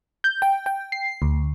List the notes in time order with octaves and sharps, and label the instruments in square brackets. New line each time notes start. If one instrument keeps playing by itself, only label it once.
[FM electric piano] G6
G5
G5
C7
D2